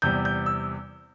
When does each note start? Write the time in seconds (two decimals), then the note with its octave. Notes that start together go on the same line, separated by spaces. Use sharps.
0.02 E2 C3 G3 G6
0.25 G6
0.46 E6